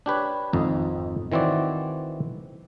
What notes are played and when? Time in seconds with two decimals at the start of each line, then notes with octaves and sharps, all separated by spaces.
0.06 D4 G4 B4 C#5
0.53 G#1 F2 D#4
1.32 D#3 E3 C4 F#4 D5